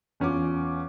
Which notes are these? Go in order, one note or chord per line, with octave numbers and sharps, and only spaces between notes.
E2 C#4 F4 D6